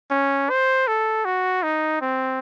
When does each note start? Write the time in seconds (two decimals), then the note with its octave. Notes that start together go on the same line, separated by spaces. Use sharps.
0.11 C#4
0.50 C5
0.87 A4
1.25 F#4
1.63 D#4
2.01 C4